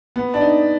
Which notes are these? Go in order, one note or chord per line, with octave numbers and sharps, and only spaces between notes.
B3
D4
D#4